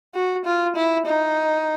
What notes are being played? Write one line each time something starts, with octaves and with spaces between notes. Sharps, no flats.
F#4
F4
E4
D#4